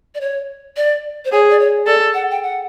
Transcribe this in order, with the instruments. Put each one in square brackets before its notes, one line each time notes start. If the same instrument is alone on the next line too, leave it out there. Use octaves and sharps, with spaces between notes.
[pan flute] D5
C#5
D5
C5
[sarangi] G#4 [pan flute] C#5
[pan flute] D5
C#5
[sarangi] A4 [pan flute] D5
[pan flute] F#5
G5
F#5